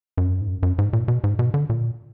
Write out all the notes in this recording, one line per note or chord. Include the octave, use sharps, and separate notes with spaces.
F#2
G#2
F#2
F#2
G#2
A#2
B2
G#2
B2
D3
A#2